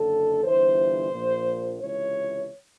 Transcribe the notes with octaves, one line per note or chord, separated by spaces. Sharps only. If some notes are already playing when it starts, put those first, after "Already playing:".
Already playing: F#1 F#2 D3 A4
G1 G2 E3 C5
A#1 A#2
C#2 C3 E3 C#5